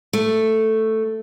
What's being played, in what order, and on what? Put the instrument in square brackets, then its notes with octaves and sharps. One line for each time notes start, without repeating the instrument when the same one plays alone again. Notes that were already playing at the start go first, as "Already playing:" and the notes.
[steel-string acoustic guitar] A3